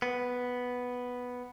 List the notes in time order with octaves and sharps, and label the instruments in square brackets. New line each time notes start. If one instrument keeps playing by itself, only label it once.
[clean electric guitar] B3